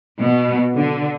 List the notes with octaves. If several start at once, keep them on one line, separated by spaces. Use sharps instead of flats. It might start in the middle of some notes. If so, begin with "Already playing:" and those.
B2
D3